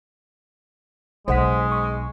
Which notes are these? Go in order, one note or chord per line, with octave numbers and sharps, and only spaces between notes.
B1 G#3 C5 F#5 B6
C#6